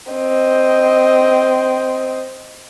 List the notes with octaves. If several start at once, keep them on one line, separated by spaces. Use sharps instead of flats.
C4 D#5